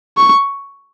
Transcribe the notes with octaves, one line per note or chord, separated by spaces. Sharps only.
C#6